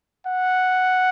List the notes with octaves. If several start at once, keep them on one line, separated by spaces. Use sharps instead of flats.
F#5